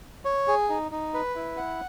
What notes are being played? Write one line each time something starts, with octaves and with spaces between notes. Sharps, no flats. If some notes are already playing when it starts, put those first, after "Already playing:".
C#5
G#4
D#4
D#4
B4
E4
F#5